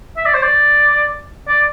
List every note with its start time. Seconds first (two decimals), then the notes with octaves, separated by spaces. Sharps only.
0.17 E5
0.26 D5
0.34 C5
0.43 D5
1.48 D5